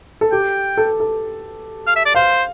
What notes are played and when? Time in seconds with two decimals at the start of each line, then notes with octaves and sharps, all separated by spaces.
0.21 A4
0.32 G4 G5
0.77 A4
1.00 A4
1.87 F5
1.96 E5
2.05 D5
2.15 C5 F5